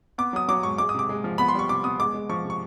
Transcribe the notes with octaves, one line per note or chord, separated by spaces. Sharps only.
B3 D6
F#3 D#6
F#3 D6
G#2 C#6
G#3 D6
D#6
C3 D6
G#3
F3
B3 B5
C6
G3 C#6
C3 D6
B3 D#6
G#3 D6
G#3
F3 C#6
C3
C#6